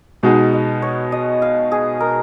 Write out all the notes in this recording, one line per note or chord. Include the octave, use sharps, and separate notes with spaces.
B2 G#3 D#4 F#4 F5
D#5
C#5
D#5
F5
G#4
A#4